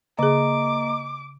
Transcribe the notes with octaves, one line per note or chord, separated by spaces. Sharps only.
C#3 A#3 G#4 D#5 A#5 D6